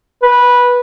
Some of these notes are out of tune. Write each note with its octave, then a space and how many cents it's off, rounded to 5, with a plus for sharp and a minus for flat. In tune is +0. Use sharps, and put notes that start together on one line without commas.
B4 -15